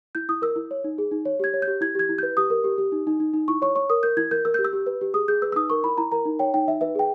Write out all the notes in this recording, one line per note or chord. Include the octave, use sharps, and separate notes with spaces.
E4 G6
E4 D#6
A#4 E6
E4
C#5
D#4
G#4
D#4
C#5
G4 G#6
C#5
G6
G4
E4 G#6
G4 G#6
E4
B4 G6
G4 D#6
A#4
G4
G4
D#4
D#4
D#4
D#4
E4 C#6
C#5 C#6
C#5 C#6
A#4 D#6
A#4 G6
E4 G#6
A#4 G6
A#4 E6
G4 G6
E6
G4
B4
G4
G#4 D#6
G#4 G6
B4 E6
E6
D#4 D#6
A#4 C#6
E4 B5
E4 A#5
A#4 A#5
D#4
C#5 G5
D#4 G5
D#4 E5
B4 E5
G#4 G5